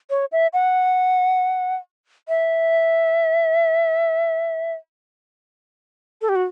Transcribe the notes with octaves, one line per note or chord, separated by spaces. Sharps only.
C#5
E5
F#5
E5
A4
G4
F#4